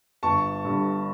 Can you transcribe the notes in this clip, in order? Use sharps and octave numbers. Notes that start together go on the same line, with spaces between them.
G1 A5 C#6
G2 D3